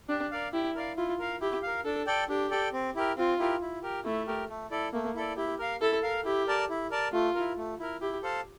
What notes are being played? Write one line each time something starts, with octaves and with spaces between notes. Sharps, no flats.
D4 G4
A#4 D5 F5
E4 G4
A#4 D5 F5
E4 F4
A#4 F5
E4 G4
A#4 F5
D4 A4
A4 D5 G5
D4 G4
A4 D5 G5
C4
E4 G4 A#4
C4 F4
E4 G4 A#4
E4
G4 A#4
A3 E4
G4 A#4
A3
E4 A4 D5
A3 A#3
E4 A4 D5
E4 G4
A#4 F5
E4 A4
A#4 F5
E4 G4
A#4 D5 A5
E4
A#4 D5 A5
A3 F4
E4 A#4
A3
E4 A#4
E4 G4
A4 C5 F5 A5